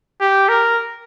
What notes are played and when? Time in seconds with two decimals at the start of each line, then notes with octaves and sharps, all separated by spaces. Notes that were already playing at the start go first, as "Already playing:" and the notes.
0.21 G4
0.49 A#4